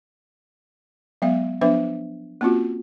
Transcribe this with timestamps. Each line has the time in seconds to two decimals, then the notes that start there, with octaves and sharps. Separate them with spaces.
1.22 F#3 G#3 B3 E5 F5
1.61 F3 B3 D4 B4 E5
2.41 A#3 C4 C#4 F4 F#4